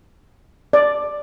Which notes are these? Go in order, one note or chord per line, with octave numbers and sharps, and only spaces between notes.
D5